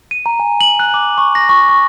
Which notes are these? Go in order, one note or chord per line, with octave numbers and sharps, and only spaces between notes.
D#7
A#5
G#5
F#7
F#6
D6
C#6
A#6
C#6
C#6